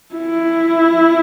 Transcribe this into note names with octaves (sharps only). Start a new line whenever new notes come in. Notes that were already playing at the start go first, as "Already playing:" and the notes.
E4